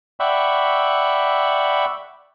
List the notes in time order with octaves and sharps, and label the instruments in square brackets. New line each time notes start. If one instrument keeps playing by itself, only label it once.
[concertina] D5 E5 F#5 G5 B5 C#6